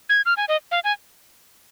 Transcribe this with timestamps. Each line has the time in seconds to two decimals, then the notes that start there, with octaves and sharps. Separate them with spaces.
0.09 G#6
0.26 F6
0.37 G#5
0.48 D#5
0.71 F5
0.84 G#5